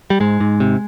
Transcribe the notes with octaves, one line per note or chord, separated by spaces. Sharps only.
G3
G#2 G#3
G#2
C3